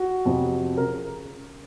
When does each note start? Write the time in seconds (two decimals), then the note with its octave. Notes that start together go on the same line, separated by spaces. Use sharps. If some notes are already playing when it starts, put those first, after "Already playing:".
Already playing: F#4
0.25 F2 C3 F3
0.77 C#3 A#4